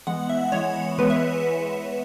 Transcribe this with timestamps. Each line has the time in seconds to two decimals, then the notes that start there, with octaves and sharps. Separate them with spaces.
0.07 E3 G#3 B3 F#5
0.29 E5
0.52 E3 G#3 B3 C#5
0.98 E3 G#3 B3 B4
1.10 E5